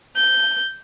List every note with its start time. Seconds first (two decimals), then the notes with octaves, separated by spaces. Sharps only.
0.16 G6